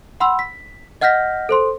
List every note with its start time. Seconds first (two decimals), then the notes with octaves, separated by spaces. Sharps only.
0.20 F#5 B5 C6 E6
0.39 B6
1.01 D#5 F#5 F6 G6 A#6 B6
1.49 A4 C5 C6